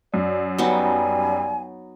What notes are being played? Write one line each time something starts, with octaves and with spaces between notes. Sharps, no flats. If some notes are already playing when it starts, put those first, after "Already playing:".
F#2 D5
F#3 G3 B3 D#4 G#5